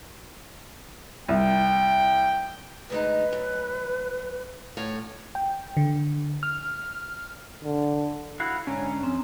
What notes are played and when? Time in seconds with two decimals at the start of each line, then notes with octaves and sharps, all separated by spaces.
1.29 C2 G5
2.90 D2 G#3 D#4 B4
3.33 F#2
4.77 A2 C#5 F5
5.35 G5
5.77 D3
6.43 F6
7.64 D3
8.40 E4 F#4 F5
8.67 G#2 D3 C#4 A#5
9.03 F2 C4